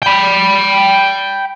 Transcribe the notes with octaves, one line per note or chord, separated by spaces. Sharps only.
G5 B5